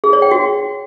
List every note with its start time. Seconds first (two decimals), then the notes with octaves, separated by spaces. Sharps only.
0.04 G#4
0.13 C#5
0.22 G5
0.31 F#4